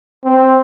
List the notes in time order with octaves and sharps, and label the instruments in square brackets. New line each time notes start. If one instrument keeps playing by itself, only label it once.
[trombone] C4